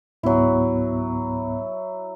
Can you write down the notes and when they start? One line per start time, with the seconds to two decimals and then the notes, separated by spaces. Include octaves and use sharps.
0.23 C#2 G#2 F#3 B3 E4